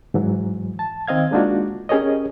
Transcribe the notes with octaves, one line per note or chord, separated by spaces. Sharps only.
G#2 E3 F#3
A5
D#3 C4 D#5 F5 G#6
G#3 A#3 D4 D#4 F4 F#4
C#4 G4 G#4 A#4 C#5 D#5